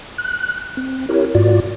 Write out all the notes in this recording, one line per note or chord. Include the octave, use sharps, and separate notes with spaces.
F#6
C4
E4 G4 A#4 C#5
G#2 F4 F#4 D5